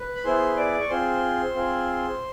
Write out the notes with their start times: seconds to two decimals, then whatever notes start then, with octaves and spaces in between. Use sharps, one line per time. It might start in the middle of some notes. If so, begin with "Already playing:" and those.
Already playing: B4
0.15 B5
0.24 B3 E4 G#4 C5 C6
0.56 D5 D6
0.80 C#6
0.89 C4 F4 G#4 C5 C6
1.54 C4 F4 G#4